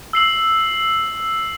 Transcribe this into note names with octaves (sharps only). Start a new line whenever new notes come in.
E6 C7 F#7